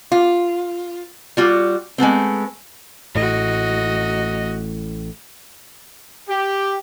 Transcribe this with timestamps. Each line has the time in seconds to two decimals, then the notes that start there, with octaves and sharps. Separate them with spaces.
0.12 F4
1.37 G3 F4 F#4
1.98 G#3 A3 B3 C4
3.15 A1 A2 F#4 D#5
6.28 G4